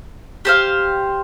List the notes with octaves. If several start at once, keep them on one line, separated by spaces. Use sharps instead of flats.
G4 C5 F5